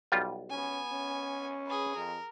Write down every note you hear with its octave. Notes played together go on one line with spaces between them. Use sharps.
B1 G3 F4
B3 C#4 G#5
C#4
G#4 B4
F2 A#4